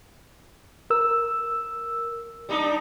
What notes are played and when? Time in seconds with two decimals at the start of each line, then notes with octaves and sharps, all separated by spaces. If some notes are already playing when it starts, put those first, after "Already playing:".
0.90 A#4 E6
2.49 G3 D4 D#4